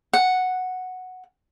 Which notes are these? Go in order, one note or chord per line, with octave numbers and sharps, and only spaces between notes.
F#5